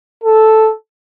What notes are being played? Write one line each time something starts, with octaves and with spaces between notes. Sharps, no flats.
A4